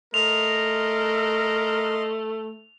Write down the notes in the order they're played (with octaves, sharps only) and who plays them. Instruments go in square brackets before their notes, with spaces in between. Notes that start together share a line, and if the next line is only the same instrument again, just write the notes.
[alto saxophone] A3 [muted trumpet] A#4 [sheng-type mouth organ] D#5 C6 [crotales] F7